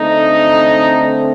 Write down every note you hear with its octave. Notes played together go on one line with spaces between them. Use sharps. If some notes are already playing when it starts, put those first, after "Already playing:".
Already playing: D3 A3 C4 D#4